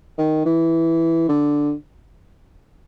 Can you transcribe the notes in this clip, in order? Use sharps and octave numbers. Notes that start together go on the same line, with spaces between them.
D#3
E3
D3